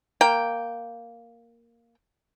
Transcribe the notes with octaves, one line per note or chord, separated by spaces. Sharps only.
A#3 G5